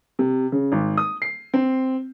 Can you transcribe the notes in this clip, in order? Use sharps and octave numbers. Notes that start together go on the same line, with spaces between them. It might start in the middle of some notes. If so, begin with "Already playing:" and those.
C3
C#3
G#1
D#6
C7
C4